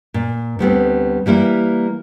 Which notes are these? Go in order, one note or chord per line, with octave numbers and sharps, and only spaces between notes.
A#2
D2 G3 B3 C4
E3 G3 A#3 E4